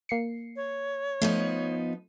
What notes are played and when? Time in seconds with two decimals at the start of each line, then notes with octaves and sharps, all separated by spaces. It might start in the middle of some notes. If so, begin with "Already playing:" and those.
0.09 A#3 C7 C#7
0.56 C#5
1.22 F3 A3 B3 D#4